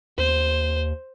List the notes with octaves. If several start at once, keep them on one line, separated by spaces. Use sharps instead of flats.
D#2 C5